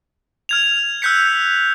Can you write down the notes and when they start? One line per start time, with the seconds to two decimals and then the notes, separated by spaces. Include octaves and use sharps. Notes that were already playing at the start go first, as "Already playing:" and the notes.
0.49 F6 G#6 F7
1.02 E6 F#6 G6 B6 C#7